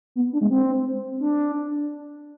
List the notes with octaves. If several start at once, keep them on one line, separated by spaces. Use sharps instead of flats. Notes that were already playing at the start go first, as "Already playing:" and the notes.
B3
D4
G#3
C4
D4